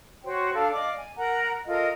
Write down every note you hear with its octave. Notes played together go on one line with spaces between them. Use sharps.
F#4 C5 C#5 G5
D4 A4 F5
D5 D#5 F5 D6
G#5
A#4 F#5 A#5
F4 A4 A#4 D#5